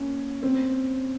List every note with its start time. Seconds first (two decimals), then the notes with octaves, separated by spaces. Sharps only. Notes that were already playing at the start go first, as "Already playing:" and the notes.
Already playing: A#3 C#4
0.42 C4